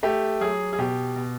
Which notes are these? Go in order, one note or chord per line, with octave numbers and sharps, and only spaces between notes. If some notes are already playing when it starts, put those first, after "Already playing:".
A3 G4
F#3 G#4
G#4
B2 G4
B2